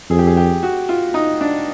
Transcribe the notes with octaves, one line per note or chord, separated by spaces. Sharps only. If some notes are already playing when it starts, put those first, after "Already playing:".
F2 G#4
G4
G#4
G4
F#4
F4
D#4
D4